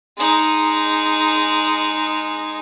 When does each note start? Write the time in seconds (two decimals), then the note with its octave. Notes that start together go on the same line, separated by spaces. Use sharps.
0.18 G#3 D#4